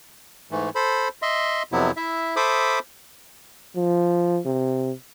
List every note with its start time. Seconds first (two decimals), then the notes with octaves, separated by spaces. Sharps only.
0.51 G#2 E3 A3
0.75 A4 C5 B5
1.22 D#5 E5 C6
1.72 F2 C3 F#3 B3 E4
1.97 E4 E5
2.36 A4 C5 E5 B5 D6 D#6
3.76 F3
4.45 C3